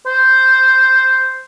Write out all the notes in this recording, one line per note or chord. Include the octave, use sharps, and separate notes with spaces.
C5